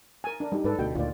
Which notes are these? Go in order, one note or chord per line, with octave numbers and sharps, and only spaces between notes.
A#4 G#5
D4 A#4
G3 D#4 G4
G#2 A4 B4 D5
D2 B2 A3 G5
D2 A#2 D#3 F4 D5